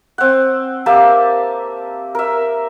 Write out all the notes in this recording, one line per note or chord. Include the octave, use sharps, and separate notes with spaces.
C4 F#5
A#3 G4 E5 A5
A#4 E5